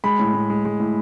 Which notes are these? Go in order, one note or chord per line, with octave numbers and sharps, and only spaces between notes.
G#3 B5
A2
A2
G#3
G#3
A2